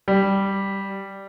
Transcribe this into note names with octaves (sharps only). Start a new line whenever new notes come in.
G3